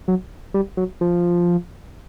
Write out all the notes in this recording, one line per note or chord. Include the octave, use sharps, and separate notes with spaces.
F#3
G3
F#3
F3